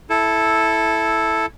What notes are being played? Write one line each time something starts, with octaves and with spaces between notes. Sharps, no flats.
E4 A4